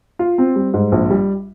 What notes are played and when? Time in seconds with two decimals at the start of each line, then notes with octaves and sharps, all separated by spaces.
0.19 F4
0.38 C4
0.56 G3
0.74 G#2
0.92 A#1
1.10 G3